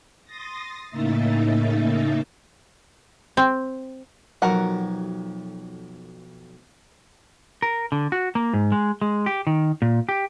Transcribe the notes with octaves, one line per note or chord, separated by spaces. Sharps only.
C6 D#6 A6 A#6
A2 C#3 A#3 D#4 E5 A6
C4
B1 F2 F#4 A#4 F#5
A#4
D3
F#4
A#3
G#2
G#3
G#3
G4
D#3
A#2
G4